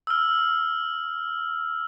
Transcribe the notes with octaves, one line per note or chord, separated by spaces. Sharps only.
E6 F6